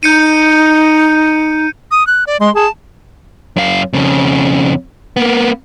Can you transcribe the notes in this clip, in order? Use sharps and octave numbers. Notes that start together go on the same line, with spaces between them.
D#4 G6 C#7 D#7
D#6
F#6
D5
G#3 C6
G#4 A5
F#2 F5
F2 C#3
A#3 B3